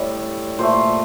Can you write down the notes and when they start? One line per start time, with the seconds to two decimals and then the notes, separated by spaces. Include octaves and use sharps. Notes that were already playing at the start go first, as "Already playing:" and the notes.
Already playing: A2 G3 D5
0.59 A#2 A3 C5